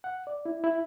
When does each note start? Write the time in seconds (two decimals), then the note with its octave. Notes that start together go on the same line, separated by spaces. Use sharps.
0.04 F#5
0.27 D5
0.45 E4
0.64 E4